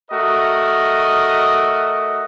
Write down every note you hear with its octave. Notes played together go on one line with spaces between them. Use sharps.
A3 F#4 A#4 D#5